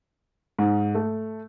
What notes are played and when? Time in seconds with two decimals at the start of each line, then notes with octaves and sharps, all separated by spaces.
0.59 G#2
0.95 A3